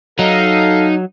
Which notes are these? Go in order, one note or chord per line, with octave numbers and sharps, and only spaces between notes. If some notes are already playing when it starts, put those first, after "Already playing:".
F#3 D#4 A4 F5